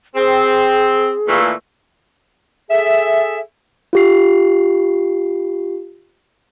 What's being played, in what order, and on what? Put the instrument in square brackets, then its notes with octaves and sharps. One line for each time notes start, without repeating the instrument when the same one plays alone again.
[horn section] C4 [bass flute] G#4
[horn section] A#2 E3 A3
[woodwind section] G#4 A4 E5
[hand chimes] F4 G4 C7